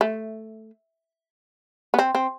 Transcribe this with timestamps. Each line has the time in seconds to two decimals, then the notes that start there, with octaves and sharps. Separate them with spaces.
0.01 A3
1.94 B3
1.99 C4
2.15 C4